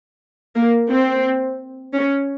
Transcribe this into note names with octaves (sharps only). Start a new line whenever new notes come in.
A#3
C4
C#4